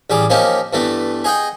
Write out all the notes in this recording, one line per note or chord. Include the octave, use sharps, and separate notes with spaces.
A1 G3 G#4 D5
F3 A#3 C#4 D#4 G4
G2 E3 A3 B3
G#4 D#5 F#5 G5